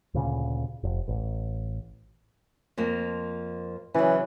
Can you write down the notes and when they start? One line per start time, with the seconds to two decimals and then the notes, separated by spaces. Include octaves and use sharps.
0.14 D2 A#2 C#3
0.83 F1
1.08 A1
2.78 F2 F3 A#3
3.94 C#3 E3 F#3